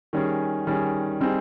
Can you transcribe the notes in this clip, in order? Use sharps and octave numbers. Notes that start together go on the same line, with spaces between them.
D#3 G3 C#4 G#4
D#3 G3 C#4 G#4
G3 C4 D#4 G#4